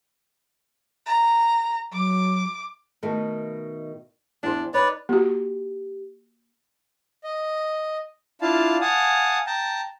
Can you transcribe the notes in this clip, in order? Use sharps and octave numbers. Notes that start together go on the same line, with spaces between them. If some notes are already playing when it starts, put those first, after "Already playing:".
A#5
F#3 D6
B2 D#3 A3
E2 D4 C5
D#4 B4 C#5 D5
A#3 F#4 G4
D#5
D4 E4 F4 F5 A5
F5 F#5 G#5 A5 D#6
G5 A5 A#5